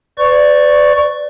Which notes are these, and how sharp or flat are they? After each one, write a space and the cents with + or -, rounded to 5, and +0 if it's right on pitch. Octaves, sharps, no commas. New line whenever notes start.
B4 +40 D5 +0 C#6 +0